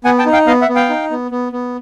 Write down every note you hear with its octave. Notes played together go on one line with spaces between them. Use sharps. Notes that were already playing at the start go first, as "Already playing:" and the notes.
B3 F#5 G#5
G5 A5
D#4
F5 G5
B3 D#5 F5
E5 F#5
B3
F5 G5
D#4
B3
B3
B3